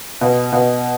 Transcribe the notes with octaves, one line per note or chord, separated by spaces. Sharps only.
B2
B2